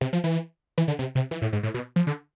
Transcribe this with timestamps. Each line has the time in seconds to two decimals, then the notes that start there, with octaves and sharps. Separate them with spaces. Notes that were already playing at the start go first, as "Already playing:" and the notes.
0.01 C3
0.13 F3
0.24 E3
0.78 E3
0.88 D3
0.99 C3
1.15 C3
1.31 E3
1.42 A2
1.53 G#2
1.63 A2
1.74 B2
1.96 F3
2.07 D3